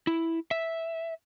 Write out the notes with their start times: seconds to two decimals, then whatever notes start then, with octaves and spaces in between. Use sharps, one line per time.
0.07 E4
0.51 E5